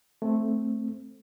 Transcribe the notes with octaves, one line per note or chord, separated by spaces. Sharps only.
A3 C4